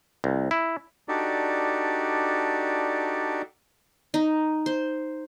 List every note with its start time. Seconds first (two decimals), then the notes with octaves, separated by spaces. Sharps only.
0.24 C2
0.51 E4
1.08 D4 D#4 F#4 G4 A4 D5
4.14 D#4
4.66 C5